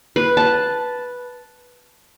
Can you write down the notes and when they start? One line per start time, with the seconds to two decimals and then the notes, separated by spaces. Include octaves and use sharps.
0.16 B4
0.37 A5